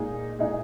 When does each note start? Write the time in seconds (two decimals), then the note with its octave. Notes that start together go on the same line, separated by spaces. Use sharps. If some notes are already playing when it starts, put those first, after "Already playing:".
Already playing: A#2 G#3 D#4 G#4
0.39 A#2 G#3 D#4 G#4